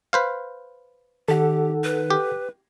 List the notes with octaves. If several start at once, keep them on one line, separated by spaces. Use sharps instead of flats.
B4 C5 F5
D#3 G4 A4 F#5
B4
G4